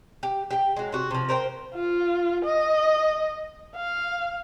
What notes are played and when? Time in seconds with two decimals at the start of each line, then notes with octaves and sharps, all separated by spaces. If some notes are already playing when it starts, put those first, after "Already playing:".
0.23 G4
0.51 G4 G5
0.76 F#3 G#3
0.92 C3 F#4
1.11 C3 F3
1.29 A#4 C5 C#5 G5
1.74 F4
2.45 D#5
3.76 F5